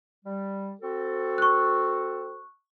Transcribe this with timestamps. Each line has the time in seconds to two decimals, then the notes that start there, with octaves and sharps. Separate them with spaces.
0.25 G3
0.82 C4 F#4 A4
1.38 C#6 F#6